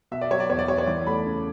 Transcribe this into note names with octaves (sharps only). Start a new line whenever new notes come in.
B2 E5
D5
F#3 C#5
D5
E2 C#5
D5
B3 C#5
C#5
E3 D5
A3 B5
C#3